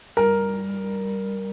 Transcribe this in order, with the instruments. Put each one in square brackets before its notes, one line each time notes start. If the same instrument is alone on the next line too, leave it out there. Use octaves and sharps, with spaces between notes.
[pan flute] G3 [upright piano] A#4